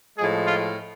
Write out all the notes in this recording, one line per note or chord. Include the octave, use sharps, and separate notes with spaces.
A2 F3 G#3 G#4
F4